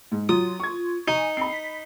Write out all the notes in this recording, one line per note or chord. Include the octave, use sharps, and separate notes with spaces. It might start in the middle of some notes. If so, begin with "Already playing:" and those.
G#2
F#3 F4 D#6
C#6 G#6
D#4 G#5
C4 B5 C7
B6